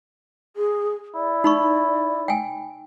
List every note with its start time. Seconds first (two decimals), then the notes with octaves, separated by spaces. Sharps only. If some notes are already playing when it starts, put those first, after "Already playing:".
0.56 G#4
1.15 E4 D5
1.44 D#4 B5 C#6
2.28 G5 G#5